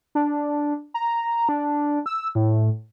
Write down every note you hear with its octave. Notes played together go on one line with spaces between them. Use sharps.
D4
A#5
D4
E6
A2